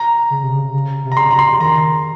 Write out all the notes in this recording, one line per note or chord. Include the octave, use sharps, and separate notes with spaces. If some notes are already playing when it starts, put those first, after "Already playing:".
Already playing: A#5
C#3
C3
C#3
C#3
C3
A#5
C#3 C6
A#5
C6
D#3 A#5